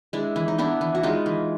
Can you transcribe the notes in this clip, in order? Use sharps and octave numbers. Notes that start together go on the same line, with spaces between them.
G#3 D4 E4
E3
D#4
B3 D4 E4
E3
F#4
G#3 D#4 F4
E3